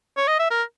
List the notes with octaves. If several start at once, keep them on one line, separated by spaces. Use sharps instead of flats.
C#5
D#5
E5
A#4